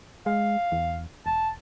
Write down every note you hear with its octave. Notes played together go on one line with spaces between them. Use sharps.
G#3 F5
E2
E1 A5